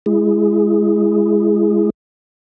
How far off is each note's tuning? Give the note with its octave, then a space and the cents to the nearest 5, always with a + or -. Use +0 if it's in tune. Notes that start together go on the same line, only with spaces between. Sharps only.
G#3 +0 E4 +30 G#4 +0